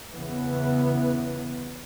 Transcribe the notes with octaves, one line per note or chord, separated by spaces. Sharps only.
E2 C#3 E3 B3